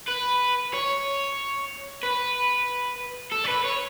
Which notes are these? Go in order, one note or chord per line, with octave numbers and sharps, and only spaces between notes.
B4
C#5
B4
A4
C#5
B4
C#5